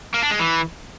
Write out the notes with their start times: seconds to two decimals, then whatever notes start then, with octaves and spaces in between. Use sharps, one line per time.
0.14 A#3
0.22 D4
0.31 G#3
0.39 E3